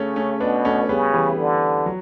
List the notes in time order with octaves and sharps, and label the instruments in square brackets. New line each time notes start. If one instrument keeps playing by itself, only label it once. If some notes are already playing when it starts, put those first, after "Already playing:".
Already playing: [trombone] C#3 [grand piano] A3 C#4
[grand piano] A3 C#4
[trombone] B2 [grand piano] B3 D4
[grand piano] A3 C#4
[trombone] C#3 [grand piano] G3 B3
[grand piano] E3 G3
[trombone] D3
[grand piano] F#3